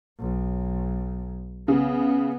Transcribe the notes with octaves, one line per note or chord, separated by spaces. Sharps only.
B1
C#3 B3